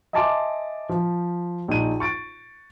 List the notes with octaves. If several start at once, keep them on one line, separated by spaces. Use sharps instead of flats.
D#5 E5 G#5 A5 C6 D6
F3
A#1 D#4 D#7
C#6 A6 D7